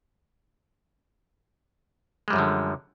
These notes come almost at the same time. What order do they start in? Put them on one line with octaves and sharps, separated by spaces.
G#3 G3 F#2 F3 D3